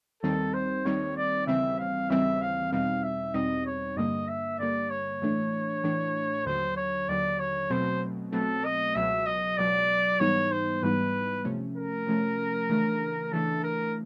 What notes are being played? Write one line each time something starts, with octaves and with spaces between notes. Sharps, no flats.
D#2 D#3 G3 C4 D#4 A4
C5
D#2 D#3 G3 C4 D#4 C#5
D5
D#2 C#3 E3 G3 C4 E5
F5
D#2 C#3 E3 G3 C4 E5
F5
E2 B2 G3 C4 D#4 F5
E5
E2 B2 G3 C4 D#4 D#5
C#5
G2 D3 G3 A#3 D#5
E5
G2 D3 G3 A#3 D5
C#5
A2 E3 A3 D4
A2 E3 A3 D4
D#2 D3 F#3 C5
C#5
D#2 D3 F#3 D5
C#5
B2 F#3 A3 C4 C5
B2 F#3 A3 C4 A4
D#5
C#2 B2 F#3 E5
D#5
C#2 B2 F#3 D5
G#2 E3 G3 B3 D#4 C#5
C5
G#2 E3 G3 B3 D#4 B4
C3 F3 A3 C#4
A#4
C3 F3 A3 C#4
C#3 E3 A3 D4
C#3 E3 A3 D4 A4
A#4